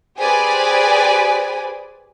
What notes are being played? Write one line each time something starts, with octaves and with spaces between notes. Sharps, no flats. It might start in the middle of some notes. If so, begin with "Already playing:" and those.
G4 G#4 B4 C5 D5 G#5